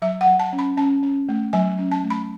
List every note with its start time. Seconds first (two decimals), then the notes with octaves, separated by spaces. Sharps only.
0.02 F#3 E5
0.21 F#5
0.27 F#3
0.40 A5
0.53 C#4
0.59 B5
0.77 C#4 A5
1.03 C#4
1.29 A3
1.53 F#3 G#5
1.79 C#4
1.92 A5
2.04 A3
2.10 B5